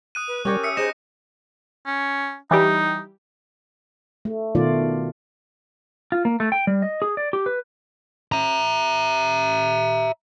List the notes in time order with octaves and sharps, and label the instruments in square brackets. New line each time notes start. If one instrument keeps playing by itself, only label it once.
[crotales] D#6 F#6 D#7
[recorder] B4
[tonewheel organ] G3 [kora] C#4 G4 C#5 [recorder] A#4
[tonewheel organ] E5 [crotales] D#6 C#7
[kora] D#4 [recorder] G#4 [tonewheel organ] C5 [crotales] A#6 E7
[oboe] C#4
[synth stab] E3 G3 G4 [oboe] D#4
[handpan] A3
B2 D#3 A3 F4 D5
[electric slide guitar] F4
A#3
A3
G5
G3
D#5
G#4
D5
G4
B4
[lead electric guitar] E5 A#5